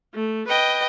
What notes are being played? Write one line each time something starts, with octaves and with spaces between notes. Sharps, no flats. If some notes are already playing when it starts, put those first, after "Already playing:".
A3
B4 D#5 G5